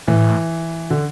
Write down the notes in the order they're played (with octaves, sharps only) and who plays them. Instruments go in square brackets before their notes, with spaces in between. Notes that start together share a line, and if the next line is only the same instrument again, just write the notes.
[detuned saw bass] A2 [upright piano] E3
[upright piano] D3